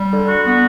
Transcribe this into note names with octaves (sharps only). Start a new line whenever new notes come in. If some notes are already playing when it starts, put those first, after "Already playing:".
Already playing: G3
D3
F#4
B3